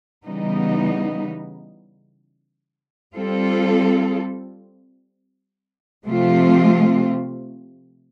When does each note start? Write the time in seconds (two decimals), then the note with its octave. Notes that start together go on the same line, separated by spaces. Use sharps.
0.25 C#3 E3 G3 B3 D#4
3.15 G3 C4 F4 A4
6.06 C3 F3 A3 C4 F4